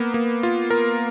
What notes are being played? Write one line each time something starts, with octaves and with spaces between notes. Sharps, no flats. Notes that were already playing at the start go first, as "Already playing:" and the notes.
Already playing: A#3 B3
A#3
F4
A#4